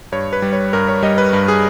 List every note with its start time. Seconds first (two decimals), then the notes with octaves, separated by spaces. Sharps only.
0.12 G2 C#5
0.33 B4
0.42 G3
0.53 C#5
0.73 G2 A#4
0.88 C#5
1.02 G3 D#5
1.18 B4
1.33 G2
1.48 G#4